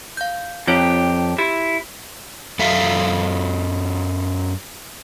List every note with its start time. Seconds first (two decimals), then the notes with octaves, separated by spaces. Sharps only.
0.17 F5 G6
0.67 F2 C4 F4 G4 C#5
1.38 E4 G4
2.59 F#2 A4 E5 F5